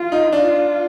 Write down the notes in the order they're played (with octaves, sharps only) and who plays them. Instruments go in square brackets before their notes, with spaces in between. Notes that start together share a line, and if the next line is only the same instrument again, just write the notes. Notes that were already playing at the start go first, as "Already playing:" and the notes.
Already playing: [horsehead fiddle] F4
[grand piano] D#4
[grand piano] D4 [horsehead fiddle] F4